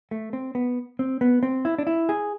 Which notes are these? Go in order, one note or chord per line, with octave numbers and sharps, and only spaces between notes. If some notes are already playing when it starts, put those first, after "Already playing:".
A3
C4
B3
C4
B3
C4
E4
D4
E4
G#4